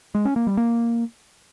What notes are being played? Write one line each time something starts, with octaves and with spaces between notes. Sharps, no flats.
G#3
C#4
A#3
G3
A#3